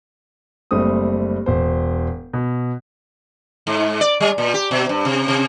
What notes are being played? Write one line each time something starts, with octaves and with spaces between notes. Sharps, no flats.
F#1 G3 A3 C4 D#6
E1 C5
B2
G#2
D5
G3
A#2
G4
B2
G2
C3
C3